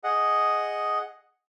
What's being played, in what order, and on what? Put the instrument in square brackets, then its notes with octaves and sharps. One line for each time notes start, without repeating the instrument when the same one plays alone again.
[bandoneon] G#4 D#5 F#5